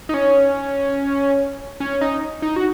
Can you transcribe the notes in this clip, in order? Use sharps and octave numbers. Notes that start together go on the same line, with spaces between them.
D#4
C#4
C#4
D#4
D#4
F#4